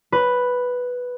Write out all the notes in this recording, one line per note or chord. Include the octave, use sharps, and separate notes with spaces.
B4